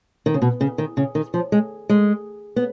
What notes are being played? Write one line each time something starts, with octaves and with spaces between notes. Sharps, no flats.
D#3
C#3
B2
C#3
D#3
C#3
D#3
F3
G#3
G#3
B3